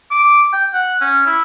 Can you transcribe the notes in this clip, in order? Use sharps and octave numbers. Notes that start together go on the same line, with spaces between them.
D6
G5
F#5
C#4
E4